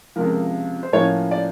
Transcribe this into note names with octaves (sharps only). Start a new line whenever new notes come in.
C#2 C3 F3 A#4
C5
A2 F3 A#3 C#4 C#5
D5